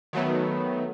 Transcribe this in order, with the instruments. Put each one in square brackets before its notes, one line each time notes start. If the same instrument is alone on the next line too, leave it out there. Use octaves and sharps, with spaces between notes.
[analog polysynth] D#3 F#3 A3 B3